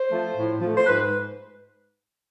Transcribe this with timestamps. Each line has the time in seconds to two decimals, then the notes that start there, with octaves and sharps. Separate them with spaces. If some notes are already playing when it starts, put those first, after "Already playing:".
Already playing: C5
0.10 F3 A3
0.36 A2
0.61 F3
0.66 A3
0.76 C5
0.86 G#2 B4